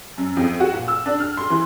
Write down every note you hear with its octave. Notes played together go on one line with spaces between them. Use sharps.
F#2
F2
F#4
A#2
E6
D4
F6
C6
E3